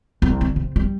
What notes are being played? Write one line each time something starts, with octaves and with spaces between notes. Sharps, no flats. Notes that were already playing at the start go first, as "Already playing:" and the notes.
C2
D3
C3
G3